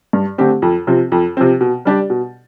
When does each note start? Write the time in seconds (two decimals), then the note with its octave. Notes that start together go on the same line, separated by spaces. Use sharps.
0.13 G2
0.38 D3 A3 C4 G4
0.62 F2
0.87 C3 F3 C4
1.12 F2
1.37 C3 F3 C4
1.61 B2
1.85 G3 D4 G4 D5
2.10 B2